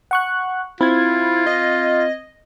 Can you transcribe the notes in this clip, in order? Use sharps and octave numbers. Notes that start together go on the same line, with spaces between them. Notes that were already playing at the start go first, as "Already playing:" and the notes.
F#5 C#6 F#6
C4 E4 F4 G#6
D#5